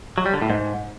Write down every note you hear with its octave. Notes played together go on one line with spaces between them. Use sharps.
F#3
G3
D3
A2
G#2